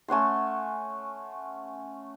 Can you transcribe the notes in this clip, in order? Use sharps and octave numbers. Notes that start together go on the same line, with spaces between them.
A3 C#4 F#5 C6